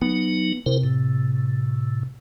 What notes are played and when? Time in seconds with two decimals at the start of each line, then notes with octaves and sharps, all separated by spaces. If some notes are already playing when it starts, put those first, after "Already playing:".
0.02 F#3 B3 D#4
0.66 C3 E4 A#4 C5
0.84 A2